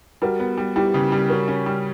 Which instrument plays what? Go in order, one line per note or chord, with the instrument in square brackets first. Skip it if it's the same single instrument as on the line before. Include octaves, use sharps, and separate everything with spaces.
[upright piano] G3 [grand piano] F#4 A#4
[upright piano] B3
G3
[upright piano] G3 [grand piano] E4 G4
[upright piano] C#3
G3
[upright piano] C#4 [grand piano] F#4 A#4
[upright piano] C#4
G3